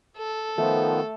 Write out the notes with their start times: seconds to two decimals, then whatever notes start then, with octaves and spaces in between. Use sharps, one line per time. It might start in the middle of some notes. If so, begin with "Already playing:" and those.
0.17 A4
0.58 D#3 F3 A3 B3